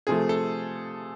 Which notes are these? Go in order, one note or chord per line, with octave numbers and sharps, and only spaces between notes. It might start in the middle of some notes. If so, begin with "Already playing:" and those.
C3 F3 A3 G#4
A4